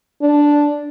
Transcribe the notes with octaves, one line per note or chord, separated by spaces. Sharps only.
D4